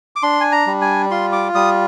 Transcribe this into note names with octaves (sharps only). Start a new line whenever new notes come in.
D6
D4 C6
G#5
A#5
G3
G#5
F4 C6
D6
G3 D#6